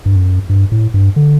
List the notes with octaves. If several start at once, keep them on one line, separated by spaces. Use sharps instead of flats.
G2
F#2
G2
A2
G2
D3